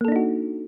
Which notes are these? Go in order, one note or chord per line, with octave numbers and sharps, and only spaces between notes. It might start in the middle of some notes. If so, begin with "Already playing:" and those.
A#3 D4 D#4 F#4 A4